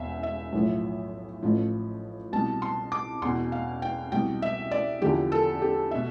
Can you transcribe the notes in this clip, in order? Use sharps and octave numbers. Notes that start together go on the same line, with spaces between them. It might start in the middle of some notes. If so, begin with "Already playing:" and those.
Already playing: E1 E2 B2 E5 F5
E5
B1 A2 F3
A1 A2 F3
C2 B2 A5
C6
D6
E2 B2 C6
F5
G5
C2 B2 G5
E5
D5
E2 D3 F3 G4
A4
G4
B2 E5